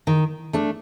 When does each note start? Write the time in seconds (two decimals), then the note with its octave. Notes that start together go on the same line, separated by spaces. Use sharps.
0.07 D#3
0.53 A3 D4